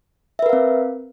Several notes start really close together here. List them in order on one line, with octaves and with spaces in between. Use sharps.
E5 B4 A#4 F5 C4